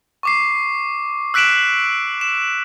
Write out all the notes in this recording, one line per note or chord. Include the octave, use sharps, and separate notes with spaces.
C#6 D6 C7
E6 F#6 B6 D7 E7 F#7
E7